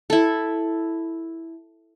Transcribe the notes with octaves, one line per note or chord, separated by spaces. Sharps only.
E4 A4